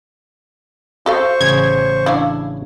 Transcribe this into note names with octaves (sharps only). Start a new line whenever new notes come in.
F#4 A4 C5 F5 C#6
A1 C#3 G#6
D4 E4 F5